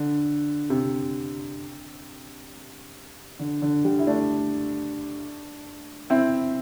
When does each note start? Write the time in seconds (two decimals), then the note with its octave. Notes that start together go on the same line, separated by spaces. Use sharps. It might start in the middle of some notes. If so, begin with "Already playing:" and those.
Already playing: D3
0.70 C3
3.39 D3
3.62 D3
3.84 D3 G3
3.99 E4
4.07 A3 D4
6.10 C4 E4